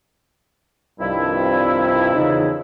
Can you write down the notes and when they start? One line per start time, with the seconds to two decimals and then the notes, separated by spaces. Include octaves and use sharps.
1.00 C2 G2 D#3 F3 E4
2.15 E2 C#3 D#4